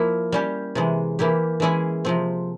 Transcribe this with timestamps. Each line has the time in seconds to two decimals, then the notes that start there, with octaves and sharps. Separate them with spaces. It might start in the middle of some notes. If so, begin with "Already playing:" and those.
Already playing: F3 A#3 E4
0.32 G3 C#4 G4
0.75 C3 E3 G#3
1.19 E3 A#3 E4 G4
1.60 E3 G#3 C#4 E4 G#4
2.05 C3 F3 C4